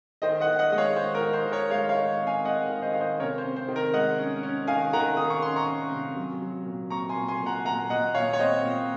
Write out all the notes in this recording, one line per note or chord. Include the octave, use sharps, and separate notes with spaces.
D#3 C5 D#5
D#5 F#5
D#3
D#5 F#5
G#3 D#5
C#5 F5
D#3 C5
A#4
D#3
C5
D#3
A#4 C#5
G#3 C#5 F5
C#5 F5
D#3
C4
F5 G#5
G#3 D#5 F#5
D#3
C5 D#5
D#3 F5
C5 D#5
C3 A#4 C#5
C5
C3
C5
D#3
A#4
G#3 D#5 F#5
C#4
C#4
D#3 F5 G#5
D#3 F#5 A#5
D#3 D#6
C#6
C#4 C6
A#5 C#6
C#4
C3
F#3
F#3
A#2
C4 A#5 C#6
G#5 C6
A#2
G#5 C6
A#2
F#5 A#5
A#2 F#5 A#5
A#2 D#5 F#5
A#2 C#5 F5
C#5
C4 C5 D#5
A#2